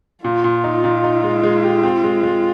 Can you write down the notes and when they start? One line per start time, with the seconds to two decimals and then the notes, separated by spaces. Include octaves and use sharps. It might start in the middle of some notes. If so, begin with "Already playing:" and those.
0.24 A#2 F4
0.44 A#2
0.64 D#4
0.84 A#2
1.04 D#4
1.24 G#3
1.43 G#3
1.63 G4
1.83 C4
2.04 G#3
2.23 G#3